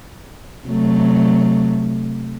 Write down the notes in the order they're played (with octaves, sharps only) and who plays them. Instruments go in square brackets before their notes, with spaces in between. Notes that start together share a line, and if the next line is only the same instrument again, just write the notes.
[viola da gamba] C3 F#3 A3